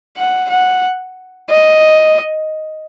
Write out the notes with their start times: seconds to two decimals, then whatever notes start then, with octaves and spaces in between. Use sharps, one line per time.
0.17 F#5
0.50 F#5
1.50 D#5